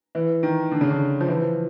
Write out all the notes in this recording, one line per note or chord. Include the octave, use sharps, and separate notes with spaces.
E3
D#3
D3
C#3
D3
F3
E3
F3